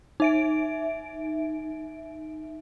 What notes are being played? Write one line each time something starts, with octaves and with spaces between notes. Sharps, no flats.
D#4 E5 D7